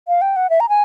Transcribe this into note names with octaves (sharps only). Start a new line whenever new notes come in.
F5
G5
F#5
E5
A#5
G#5